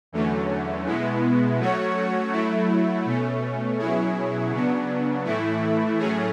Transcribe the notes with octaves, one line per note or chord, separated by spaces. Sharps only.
E2 D3 F#3 A3 C#4
B2 G#3 B3 E4
F#3 A3 C#4 F#4 C#5
F#3 A3 E4
B2 A3 C#4
B2 F#3 C#4 E4 G#4
C#3 F#3 B3 D4
A2 E3 A3 E4
A2 F#3 A3 C#4 G#4